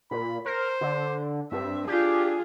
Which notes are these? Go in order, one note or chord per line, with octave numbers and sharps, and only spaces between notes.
A#2 B5
A#4 C5
D3
G2 C4 E5
D4 F4 G4 G#4